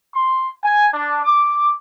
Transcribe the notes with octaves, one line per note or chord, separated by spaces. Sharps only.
C6
G#5
D4
D6